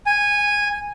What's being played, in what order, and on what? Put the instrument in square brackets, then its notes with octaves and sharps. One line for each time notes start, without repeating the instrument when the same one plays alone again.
[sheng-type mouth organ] G#5